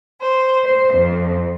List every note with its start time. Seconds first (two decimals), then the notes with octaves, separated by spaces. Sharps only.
0.20 C5
0.64 C5
0.94 F2